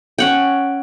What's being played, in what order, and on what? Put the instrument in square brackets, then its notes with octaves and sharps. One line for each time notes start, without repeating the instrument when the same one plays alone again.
[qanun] C#4 F#5 G5